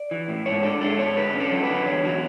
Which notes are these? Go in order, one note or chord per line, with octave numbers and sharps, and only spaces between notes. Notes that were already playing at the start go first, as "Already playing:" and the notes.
Already playing: D5
E3
A2
G#2 C#5
D4 A4
G#3 A4
G#2 C#5
D3 B4
C#4
A4
F#3
B4
D3
E2 C#5
F#3